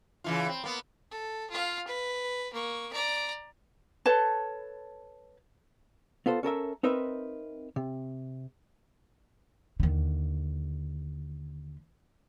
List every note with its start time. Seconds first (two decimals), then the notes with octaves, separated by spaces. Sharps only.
0.24 C#3 E3 F4
0.48 C4
0.64 A#3 B3
1.11 A4
1.51 F4 F5
1.88 B4
2.53 A#3 C#6
2.93 D5 A#5
4.06 A4 B4 C#5 A5
6.26 B3 F4 A4 C5
6.43 C#4 A4 A#4 E5
6.83 C4 D#4 A#4 B4 E5
7.76 C3
9.80 D#2 D3